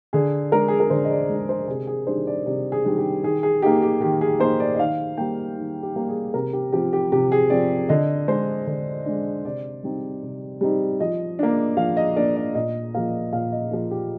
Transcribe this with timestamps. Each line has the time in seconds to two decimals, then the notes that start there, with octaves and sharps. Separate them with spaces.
0.13 D3 G#4
0.52 G#3 D4 A#4
0.68 G#4
0.80 A#4
0.90 D3 C5
1.05 D#5
1.11 D5
1.29 G#3 D4
1.49 C5
1.68 C3 G#4
1.87 G#4
2.07 D#3 G3 D4 C5
2.27 D5
2.46 C3 D5
2.72 G#4
2.84 D#3 G3 D4
2.98 G4
3.23 D#3 G#4
3.43 G#4
3.62 A#3 D#4 G4
3.82 G4
4.01 D#3 G4
4.21 G#4
4.40 A#3 D#4 C5
4.60 D5
4.75 D#5
4.78 D#3 F5
5.17 G3 A#3 G5
5.56 D#3
5.83 G4
5.96 G3 A#3
6.08 G#4
6.34 C3 A#4
6.53 G4
6.72 F3 C4 G4
6.93 G4
7.12 C3 G4
7.32 G#4
7.50 F3 C4 D5
7.89 D3 D#5
8.28 G#3 D4 C5
8.67 D3
9.06 G#3 D4
9.44 C3 D5
9.83 G3 C4 D#4
10.23 C3
10.61 G3 C4 D#4
11.00 F3 D#5
11.39 A#3 D4
11.77 F3 F5
11.97 D#5
12.16 A#3 D4 D5
12.36 D5
12.55 A#2 D#5
12.95 F3 A#3 F5
13.32 A#2 F5
13.52 D#5
13.71 F3 A#3
13.91 G4